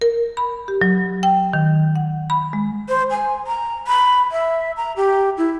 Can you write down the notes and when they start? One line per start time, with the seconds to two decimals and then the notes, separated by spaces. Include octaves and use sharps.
0.01 A#4
0.37 B5
0.68 G4
0.82 F#3
1.23 G5
1.53 D#3
1.96 F#5
2.30 B5
2.53 G#3
2.89 C5
3.11 G#5
3.47 A#5
3.87 B5
4.32 E5
4.77 A#5
4.96 G4
5.38 E4